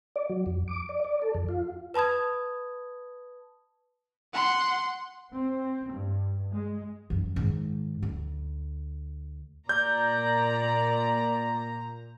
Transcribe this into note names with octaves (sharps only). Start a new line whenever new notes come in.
D5
F#3
F2
D6
D5
D5
A4
F2
F4
B4 A5 B5 D#6 G#6
F#5 C6
C4
G2
G#3
F#2 E3
G#2 D#3
D2
A#2 D5 A#5 G6